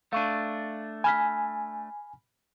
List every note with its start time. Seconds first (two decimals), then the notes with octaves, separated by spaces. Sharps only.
0.13 A3 D4 F5 C#6 D#7
1.04 G#5 B5 F6 B6